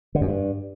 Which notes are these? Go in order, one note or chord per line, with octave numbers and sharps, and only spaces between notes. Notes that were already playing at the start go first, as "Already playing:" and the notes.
D3
F#2
G2